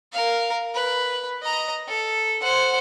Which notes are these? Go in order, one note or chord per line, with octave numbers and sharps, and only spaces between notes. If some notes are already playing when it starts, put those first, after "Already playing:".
A#4 F5
B4
D#5 A#5
A4
C5 F#5